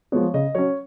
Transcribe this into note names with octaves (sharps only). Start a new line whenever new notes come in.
F3 G#3 B3 C#5
C#3 D#5
F#3 C#4 C#5